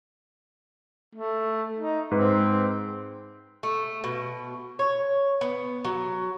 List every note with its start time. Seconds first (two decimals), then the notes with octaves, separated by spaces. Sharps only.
1.15 A3
1.79 D#4
2.11 G#2 C4 B4
3.63 A3
4.04 B2
4.79 C#5
5.41 B3
5.85 F#3